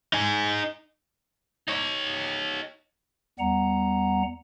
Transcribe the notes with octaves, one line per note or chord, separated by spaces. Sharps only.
D#4 G#5
D#4 C#5
E2 G3 B3 F#5 A#5